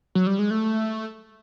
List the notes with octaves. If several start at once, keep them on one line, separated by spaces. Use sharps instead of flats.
F#3
G3
G#3
A3